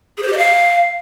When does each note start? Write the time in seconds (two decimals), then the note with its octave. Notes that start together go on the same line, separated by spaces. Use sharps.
0.17 G#4
0.22 C5
0.27 G4
0.33 D#5
0.38 F5